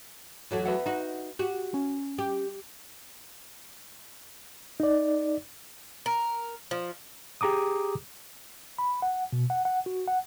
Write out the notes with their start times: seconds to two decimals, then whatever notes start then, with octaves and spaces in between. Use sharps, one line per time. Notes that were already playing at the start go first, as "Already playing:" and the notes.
0.51 E2 F#3 A3
0.65 B4 E5 F#5
0.86 D#4 F#4
1.39 F#4 G4
1.74 C#4
2.18 G4
4.80 D#4 D5
6.06 A#4
6.71 F3
7.41 G4 G#4 A#5 D6 D#6
8.78 B5
9.02 F#5
9.33 B2
9.50 F#5
9.65 F#5
9.86 F#4
10.08 F#5